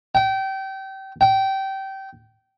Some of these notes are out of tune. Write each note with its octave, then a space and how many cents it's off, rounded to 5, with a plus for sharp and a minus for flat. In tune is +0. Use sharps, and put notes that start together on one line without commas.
G5 -25
G5 -20